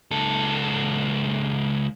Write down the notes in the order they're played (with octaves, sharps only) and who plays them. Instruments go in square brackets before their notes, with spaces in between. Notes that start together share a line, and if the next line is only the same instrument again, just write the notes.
[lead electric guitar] C#2 A4